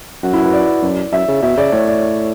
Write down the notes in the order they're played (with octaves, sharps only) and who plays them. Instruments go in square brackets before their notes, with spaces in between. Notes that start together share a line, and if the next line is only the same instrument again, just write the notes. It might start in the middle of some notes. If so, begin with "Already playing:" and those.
[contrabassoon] F#2 [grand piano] F#4
[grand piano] E4
B4
D5
[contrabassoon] F#2
[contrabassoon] F#2 [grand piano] E5
[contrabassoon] C#3
[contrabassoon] B2 [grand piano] E5
[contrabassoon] C#3 [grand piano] D5
[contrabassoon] A2 [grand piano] C#5
[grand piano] D5